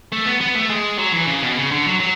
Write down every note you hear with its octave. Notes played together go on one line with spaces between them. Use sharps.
A3
B3
B3
A3
G#3
F#3
E3
C#3
B2
C#3
D3
F#3
F#3